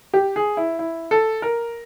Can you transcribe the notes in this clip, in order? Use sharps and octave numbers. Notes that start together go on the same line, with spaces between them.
G4
G#4
E4
E4
A4
A#4